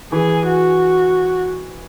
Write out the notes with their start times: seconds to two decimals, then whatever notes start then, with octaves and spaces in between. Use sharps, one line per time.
0.12 E3 G#4
0.47 F#4